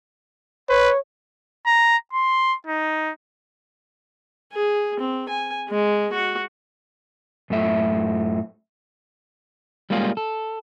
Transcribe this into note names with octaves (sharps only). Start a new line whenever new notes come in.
B4 C#5
A#5
C6
D#4
G#4
C4
G#5
G#3
F#4
F#2 A2 A3 E5
G3 G#3 A#3 C#4 F4 G#4
A4